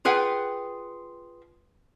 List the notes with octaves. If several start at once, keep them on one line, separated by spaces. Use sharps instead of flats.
F4 G#4 B4 F#5 G5